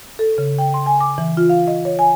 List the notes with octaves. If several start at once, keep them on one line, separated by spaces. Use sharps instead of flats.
A4
C#3
G5
C6
G#5
D6
E3
F4
F5
D#5
C#5
G#5